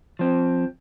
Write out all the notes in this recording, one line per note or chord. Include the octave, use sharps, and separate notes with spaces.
F3 C4